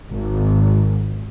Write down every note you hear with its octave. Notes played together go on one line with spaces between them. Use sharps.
G#1